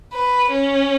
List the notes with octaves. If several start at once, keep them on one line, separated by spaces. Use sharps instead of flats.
B4
C#4